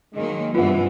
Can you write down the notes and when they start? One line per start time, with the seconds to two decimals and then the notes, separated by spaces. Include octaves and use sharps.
0.15 D#3 F#3 G#3 A#3
0.55 G2 C3 E3 B3 F4 F#5